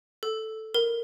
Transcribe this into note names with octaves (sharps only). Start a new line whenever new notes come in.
A4
A#4